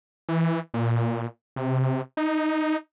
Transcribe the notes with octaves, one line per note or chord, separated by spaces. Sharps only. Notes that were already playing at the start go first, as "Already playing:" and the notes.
E3
A#2
C3
D#4